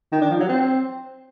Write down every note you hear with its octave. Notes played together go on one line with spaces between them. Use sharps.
D#3
D4
F3
F#3
C4